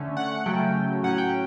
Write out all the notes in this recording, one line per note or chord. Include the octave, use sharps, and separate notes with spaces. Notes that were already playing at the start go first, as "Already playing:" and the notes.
Already playing: D3 A3 C#4
F#5
C#3 F#3 A3 C#4 G5
A2 F#3 C#4 F#5
G5